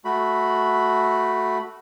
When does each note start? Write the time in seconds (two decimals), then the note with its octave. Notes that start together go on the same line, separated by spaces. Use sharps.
0.05 A3 F#4 B5